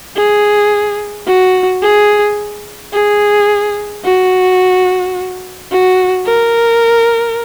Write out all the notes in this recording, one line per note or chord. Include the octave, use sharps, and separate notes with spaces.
G#4
F#4
G#4
G#4
F#4
F#4
A#4